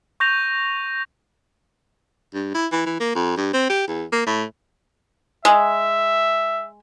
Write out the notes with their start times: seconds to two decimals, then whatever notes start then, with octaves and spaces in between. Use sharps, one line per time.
0.20 C#6 G6 A#6 F7
2.34 G2
2.54 E4
2.72 E3
2.86 E3
3.00 A#3
3.15 F2
3.37 G2
3.53 C4
3.69 G4
3.87 E2
4.12 A#3
4.26 A2
5.45 G#3 E5